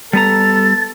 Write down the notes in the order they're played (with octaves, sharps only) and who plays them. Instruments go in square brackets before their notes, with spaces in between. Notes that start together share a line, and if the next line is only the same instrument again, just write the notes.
[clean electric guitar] G3 B3 A#5 [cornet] A4 [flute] A6